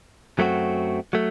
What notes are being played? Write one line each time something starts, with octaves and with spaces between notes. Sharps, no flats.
F#2 F#3 A3 C4 F#4
F#3 A3